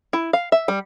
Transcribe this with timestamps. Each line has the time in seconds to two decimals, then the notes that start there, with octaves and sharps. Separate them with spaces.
0.13 E4
0.33 F5
0.52 E5
0.68 G3